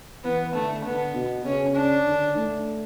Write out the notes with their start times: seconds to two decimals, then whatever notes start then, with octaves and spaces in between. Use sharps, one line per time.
0.24 E3 B3
0.55 D3 A3
0.84 D3 B3
1.14 B2
1.45 C#3 C#4
1.76 D4
2.06 D3
2.36 A3